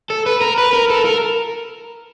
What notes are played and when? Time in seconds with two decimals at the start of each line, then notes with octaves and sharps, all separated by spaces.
0.10 A4
0.26 B4
0.41 A#4
0.58 B4
0.73 A#4
0.90 A4
1.05 A#4